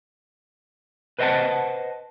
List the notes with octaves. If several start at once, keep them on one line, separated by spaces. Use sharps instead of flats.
B4 C5 D#5 F5 F#5 A5